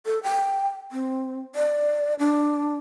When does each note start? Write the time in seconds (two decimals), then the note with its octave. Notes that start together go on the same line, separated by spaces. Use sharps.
0.06 A4
0.23 G5
0.92 C4
1.55 D5
2.19 D4